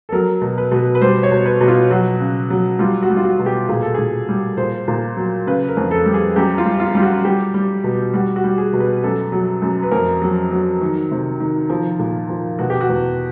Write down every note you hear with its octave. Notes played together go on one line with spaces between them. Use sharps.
A4
F#3 A#4
B2
B4
B2
B4
G3 C5
C#5
B2
B4
B2
F4
F#3 F#4
C#3
F#3
G3 F4
F#4
G3
F4
F#4
B2
G4
A#2 G#4
A4
A#2 G#4
G3
A#2 C5
A#2
F#3
C#3 B4
A#4
F2
A4
G3
G#4
F#2 G4
F4
G3
F4
G3 F4
F#4
G3 G4
G3
B2
G3 F#4
F#4
G3
G#4
B2
B4
F#2 A4
F#3
F#2
B4
F2 A#4
F#3
F#3
D#3
C3
D#3
F3
A#2
F3
B2 F#4
G4
F#4
E2